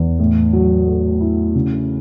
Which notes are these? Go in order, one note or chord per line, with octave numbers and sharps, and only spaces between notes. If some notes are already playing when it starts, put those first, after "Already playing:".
Already playing: E2
A2
F#3
A3
E4
C#3